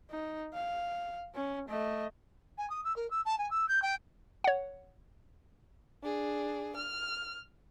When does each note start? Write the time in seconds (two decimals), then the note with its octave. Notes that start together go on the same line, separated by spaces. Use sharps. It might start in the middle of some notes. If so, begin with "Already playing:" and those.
0.10 D#4
0.54 F5
1.35 C#4
1.68 A3 D#5
2.57 G#5
2.69 D#6
2.84 E6
2.96 A#4
3.10 E6
3.25 A5
3.38 G#5
3.50 E6
3.68 G6
3.82 G5
4.44 C#5 F#5
6.03 D4 G#4
6.77 F6